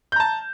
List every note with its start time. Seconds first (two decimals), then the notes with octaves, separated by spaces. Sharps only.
0.12 G6
0.16 A#5
0.20 A5